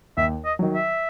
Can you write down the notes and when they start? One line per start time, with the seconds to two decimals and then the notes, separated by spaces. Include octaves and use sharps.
0.17 D#2 E5
0.45 D#5
0.59 D#3 F#3
0.74 E5